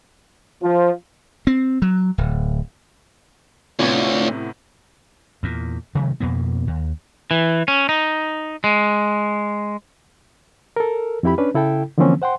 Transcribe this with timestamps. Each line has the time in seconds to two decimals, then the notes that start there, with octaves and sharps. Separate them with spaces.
0.62 F3
1.47 C4
1.82 F#3
2.18 D1
3.79 D2 A2 C3 B3 D4 F4 C#5
5.43 E2 A#2
5.95 C3 D#3 F#3 A3
6.20 F2 B2 A#3 B3
6.67 D#2
7.31 E3
7.68 C#4
7.89 D#4
8.64 G#3
10.76 A4 A#4
11.23 F2 C4 E4 G4 B5
11.38 C#4 D4 B4
11.54 C#3 E4 A4 G5
11.98 D3 E3 F3 A#3 C4 C#4
12.22 C5 F#5 G5 C6